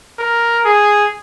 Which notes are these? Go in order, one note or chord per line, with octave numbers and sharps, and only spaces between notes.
A#4
G#4